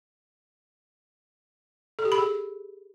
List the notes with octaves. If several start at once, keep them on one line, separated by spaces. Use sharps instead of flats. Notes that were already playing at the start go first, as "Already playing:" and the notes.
A4
G4
B5
G#4